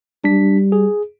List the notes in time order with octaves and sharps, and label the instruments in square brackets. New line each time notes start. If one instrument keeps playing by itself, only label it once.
[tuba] G3 [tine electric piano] D4 B6
[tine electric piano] G#4